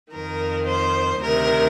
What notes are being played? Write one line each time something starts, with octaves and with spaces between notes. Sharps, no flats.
F2 D#3 A#4
C5
D2 C3 D#3 A#4